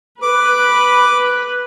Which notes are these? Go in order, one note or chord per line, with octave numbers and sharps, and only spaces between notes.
B4 D6